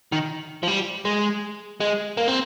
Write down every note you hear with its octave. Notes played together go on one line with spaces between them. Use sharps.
D#3
F3
G3
G#3
G#3
A#3
C4